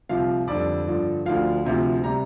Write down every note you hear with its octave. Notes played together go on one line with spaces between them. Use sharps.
C2 C3 F3 F5
F2 D3 G3 D5
G2 D3 F3
D2 D3 F3 F5
D2 C3 F3
C3 G3 A#5